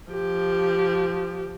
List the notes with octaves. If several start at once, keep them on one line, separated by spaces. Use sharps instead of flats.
F3 G4